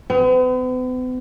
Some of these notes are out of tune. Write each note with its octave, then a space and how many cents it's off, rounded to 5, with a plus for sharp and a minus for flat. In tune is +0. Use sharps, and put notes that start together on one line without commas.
B3 +45